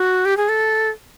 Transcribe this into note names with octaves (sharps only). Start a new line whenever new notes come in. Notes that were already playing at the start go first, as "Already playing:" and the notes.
Already playing: F#4
G4
G#4
A4